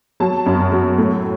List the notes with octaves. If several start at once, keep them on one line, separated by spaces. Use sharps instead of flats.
F#3 A5
F#2
F#3
A2